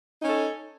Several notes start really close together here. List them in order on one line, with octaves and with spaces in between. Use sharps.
D#4 C#4 A4